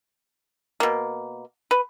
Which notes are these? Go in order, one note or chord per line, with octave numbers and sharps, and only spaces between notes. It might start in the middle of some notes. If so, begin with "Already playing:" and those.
B2 A#3
B4